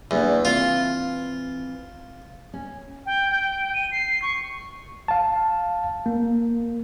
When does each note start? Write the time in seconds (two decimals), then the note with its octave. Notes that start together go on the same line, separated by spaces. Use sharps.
0.11 E2 G3 A#3 D4
0.45 E3 C4 F4
2.54 C#4
3.06 G5
3.30 G5
3.74 D#7
3.92 C7
4.22 C#6
5.08 F5 A5
6.06 A#3